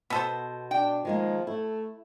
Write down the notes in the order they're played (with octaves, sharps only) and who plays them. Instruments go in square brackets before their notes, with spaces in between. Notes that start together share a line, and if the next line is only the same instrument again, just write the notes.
[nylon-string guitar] B2 [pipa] B3 A4 C5
[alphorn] D4 [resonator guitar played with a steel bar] G5
[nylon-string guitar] D#3 G#3 A#3 [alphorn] F3
[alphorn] A3 [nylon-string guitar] E4